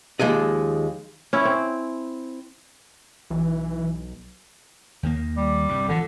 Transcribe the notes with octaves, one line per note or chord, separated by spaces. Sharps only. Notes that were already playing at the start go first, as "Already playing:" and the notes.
D#2 F3 G#3 D#5
C#4 E4
C4
B1 E3
D#2 D#3 A#3
G3
C2 G2
G#1 D3 E3 F3